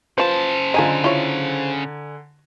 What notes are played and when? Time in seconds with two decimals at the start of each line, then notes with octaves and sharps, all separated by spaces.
0.18 C#3 F3 B4 C5 A5
0.74 D3 F4 D#5 G#5 A#5
1.04 E4 F4 C#5